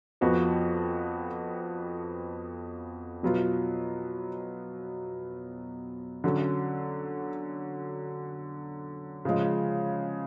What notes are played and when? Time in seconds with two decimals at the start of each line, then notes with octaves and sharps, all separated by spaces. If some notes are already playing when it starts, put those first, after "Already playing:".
0.21 F2 F3 B3 F#4
3.23 B2 F#3 B3 F4
6.24 D3 F#3 C#4
9.25 C#3 F3 G#3